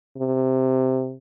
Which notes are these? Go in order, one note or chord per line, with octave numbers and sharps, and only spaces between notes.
C3